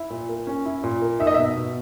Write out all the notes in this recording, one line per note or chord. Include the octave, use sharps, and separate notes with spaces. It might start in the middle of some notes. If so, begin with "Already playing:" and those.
Already playing: E4
A#2
A#3
C#4
E4
A#2
A#3
D#4 E5
D#5
B2 E5
B2